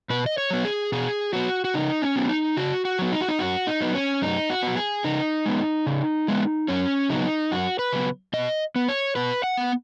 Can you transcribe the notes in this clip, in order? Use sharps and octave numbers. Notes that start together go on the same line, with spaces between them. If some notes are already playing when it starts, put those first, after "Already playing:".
B2 B4
D#5
C#5
F#3 B3
G#4
B2 G#4
F#3 B3 F#4
F#4
C#3 D#4
C#4
F#3 B3
D#4
C#3 F#4
F#4
F#3 B3
D#4
F#4
D#4
F#2 F#4
D#4
F#3 B3
C#4
F#2 D#4
F#4
F#3 B3
G#4
C#3 D#4
G#3 B3
C#3
G#3 B3
F#2 C#4
C#3 F#3 B3 D#4
F#2 F#4
B4
C#3 F#3 B3
B2 D#5
B3
C#5
B2 B4
F#5
B3